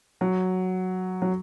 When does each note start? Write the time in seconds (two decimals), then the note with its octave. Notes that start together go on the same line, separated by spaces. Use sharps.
0.21 F#3
1.22 F#3